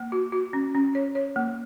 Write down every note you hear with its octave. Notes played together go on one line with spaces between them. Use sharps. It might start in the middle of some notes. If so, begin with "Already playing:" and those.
Already playing: A#3
F#4
F#4
C#4
C#4
C#5
C#5
A#3